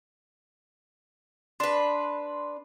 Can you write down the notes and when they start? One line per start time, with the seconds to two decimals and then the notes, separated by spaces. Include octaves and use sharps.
1.60 D4 B4 C6